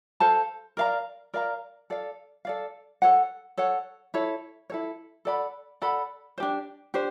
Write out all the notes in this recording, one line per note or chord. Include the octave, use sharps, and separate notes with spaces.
A4 C5 F5 A5
A#4 D5 F5 A#5
A#4 D5 F5 A#5
A4 D5 F5
A4 D5 F5
A4 C#5 F#5
A4 C#5 F#5
E4 A4 C#5
E4 A4 C#5
A4 D5 F#5 B5
A4 D5 F#5 B5
D4 G4 C5
D4 G4 C5